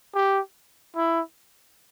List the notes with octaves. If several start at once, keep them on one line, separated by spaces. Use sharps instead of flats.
G4
E4